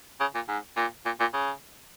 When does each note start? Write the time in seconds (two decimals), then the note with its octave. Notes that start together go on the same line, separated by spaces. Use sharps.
0.20 C#3
0.35 A#2
0.48 G#2
0.77 A#2
1.05 A#2
1.20 A#2
1.33 C#3